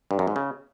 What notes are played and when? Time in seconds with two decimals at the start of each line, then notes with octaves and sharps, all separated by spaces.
0.11 G2
0.19 F#2
0.27 G#2
0.36 C#3